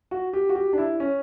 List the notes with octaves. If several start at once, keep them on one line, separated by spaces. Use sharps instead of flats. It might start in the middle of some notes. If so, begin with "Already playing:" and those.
F#4
G4
F#4
G4
D4
E4
C#4